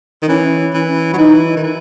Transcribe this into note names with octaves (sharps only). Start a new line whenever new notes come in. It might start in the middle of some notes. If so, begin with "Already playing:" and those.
D#3
E3 C#4
E3 C#4
F#3
E3 D#4
D#3
E3